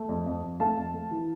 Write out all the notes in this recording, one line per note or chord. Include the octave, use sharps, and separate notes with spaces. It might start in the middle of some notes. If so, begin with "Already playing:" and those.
Already playing: A3
F2
F2
F2
A3 F5 A5
F2
A3
E3